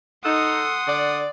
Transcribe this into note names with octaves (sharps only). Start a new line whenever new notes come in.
D#4 A4 F#5 C6 D#6
D3 D5